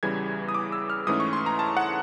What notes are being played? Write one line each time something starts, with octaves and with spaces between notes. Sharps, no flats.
E2 C#3 E3 G3 G#6
D#6
D6
E6
F6
G#2 E3 A3 C#4 D#6
C#6
C6
A#5
A5
F#5